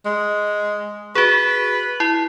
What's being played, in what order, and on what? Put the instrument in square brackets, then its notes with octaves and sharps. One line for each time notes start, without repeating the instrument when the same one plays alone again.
[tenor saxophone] G#3
[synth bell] F#4 G#4 [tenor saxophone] B4
[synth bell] E4